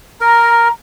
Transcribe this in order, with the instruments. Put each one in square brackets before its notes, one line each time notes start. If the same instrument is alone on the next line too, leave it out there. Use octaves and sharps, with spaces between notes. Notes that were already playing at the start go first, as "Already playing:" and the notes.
[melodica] A#4 [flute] A#5